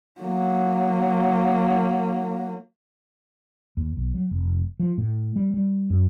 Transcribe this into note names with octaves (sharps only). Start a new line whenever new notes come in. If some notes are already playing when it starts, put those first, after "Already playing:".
F#3 A#3
D#2
B1
F#3
F1
F3
A2
G3
G3
F#2